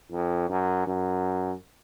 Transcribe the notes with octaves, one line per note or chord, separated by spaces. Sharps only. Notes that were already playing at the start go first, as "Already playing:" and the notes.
F2
F#2
F#2